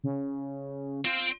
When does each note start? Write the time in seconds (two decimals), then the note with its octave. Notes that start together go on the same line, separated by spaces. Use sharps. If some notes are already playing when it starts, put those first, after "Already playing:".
0.04 C#3
1.05 C4 F4 C5